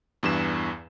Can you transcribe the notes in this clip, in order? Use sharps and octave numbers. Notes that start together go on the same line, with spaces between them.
E2 G2 E3 E7